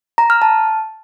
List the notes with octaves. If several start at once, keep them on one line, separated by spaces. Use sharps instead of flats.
A#5
F6
A5